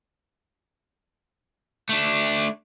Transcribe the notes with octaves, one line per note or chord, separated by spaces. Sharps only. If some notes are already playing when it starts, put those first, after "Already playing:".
A3 D4